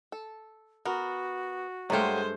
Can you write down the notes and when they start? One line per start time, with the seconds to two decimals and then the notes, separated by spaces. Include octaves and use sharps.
0.12 A4
0.85 B3 F#4 A#4
1.90 G2 F#3 G#3 A3 G4 C5 F5